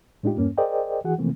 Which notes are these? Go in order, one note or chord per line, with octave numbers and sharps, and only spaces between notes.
A2 G#3 D4 D#4 F4 G4
E2 G2 A#3 C#4
G#4 A#4 C5 D5 D#5 G5
E3 F#4 G#4 F#5
C3 E3 F3 A3 A#3 C4